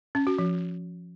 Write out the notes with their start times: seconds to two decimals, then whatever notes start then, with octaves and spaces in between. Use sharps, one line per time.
0.15 C#4
0.27 F#4
0.38 F3